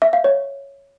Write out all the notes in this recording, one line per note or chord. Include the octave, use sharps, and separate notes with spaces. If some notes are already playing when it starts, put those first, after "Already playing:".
E5
F5
C#5